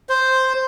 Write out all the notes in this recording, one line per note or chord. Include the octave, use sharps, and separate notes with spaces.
C5